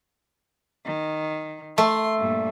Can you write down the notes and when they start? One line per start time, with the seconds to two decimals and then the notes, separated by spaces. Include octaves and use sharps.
0.85 D#3
1.78 A3 C6
2.18 G2 A#2